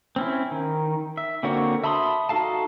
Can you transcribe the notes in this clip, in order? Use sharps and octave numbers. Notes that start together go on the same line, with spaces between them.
C4 C#4 E4
D#3
E5
D3 A#3 C4 F#4 C#5
E5 A5 B5 C6 D#6
D#4 F#4 A4 F5 A5